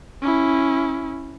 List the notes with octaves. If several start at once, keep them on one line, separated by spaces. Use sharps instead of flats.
C#4 E4